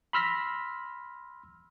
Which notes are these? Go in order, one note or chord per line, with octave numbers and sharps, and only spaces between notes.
B5 C6 E6 F6 A#6 B6